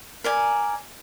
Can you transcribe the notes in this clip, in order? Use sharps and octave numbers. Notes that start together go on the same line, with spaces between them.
A#4 D5 G#5